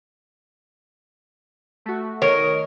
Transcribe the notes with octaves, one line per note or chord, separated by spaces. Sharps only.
A3 F#4
D#3 A#4 C#5 D#5